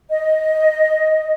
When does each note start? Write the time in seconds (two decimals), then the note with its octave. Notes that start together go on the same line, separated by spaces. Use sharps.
0.10 D#5